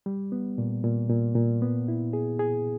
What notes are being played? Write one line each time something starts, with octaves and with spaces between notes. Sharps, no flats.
G3
B3
A#2
A#2
A#2
A#2
B3
E4
G#4
G#4